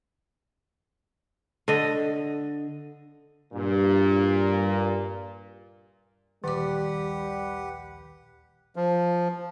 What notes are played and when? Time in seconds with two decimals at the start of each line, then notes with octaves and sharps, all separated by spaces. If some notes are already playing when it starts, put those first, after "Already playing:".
1.68 D3 D#5
3.53 G2 A#2
6.44 A#1 D#2 D#3 G3 G4 B4 F#5 D6
8.76 F3